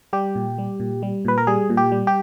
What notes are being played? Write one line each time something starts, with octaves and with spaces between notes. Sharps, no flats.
G3 G4
A#2
G3
A#2
G3
A#2 B4
A#4
G3 G#4
A#2
G4
G3
G4